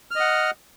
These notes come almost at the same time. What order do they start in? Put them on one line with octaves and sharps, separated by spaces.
F6 D#5 F#5